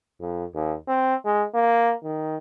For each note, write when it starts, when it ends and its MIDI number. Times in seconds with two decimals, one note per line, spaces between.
0.21 0.45 41
0.54 0.75 39
0.88 1.15 60
1.25 1.45 56
1.55 1.94 58
2.03 2.37 51